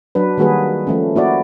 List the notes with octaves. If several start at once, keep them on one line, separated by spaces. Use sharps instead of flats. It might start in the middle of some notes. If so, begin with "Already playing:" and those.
F#3 D4 B4
D#3 G3 A#3 F#4 G#4 B4
F3 A3 C#4
A#3 E4 F#4 D5